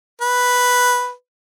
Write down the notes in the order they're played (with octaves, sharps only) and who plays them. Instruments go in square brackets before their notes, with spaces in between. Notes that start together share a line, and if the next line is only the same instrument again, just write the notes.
[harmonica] B4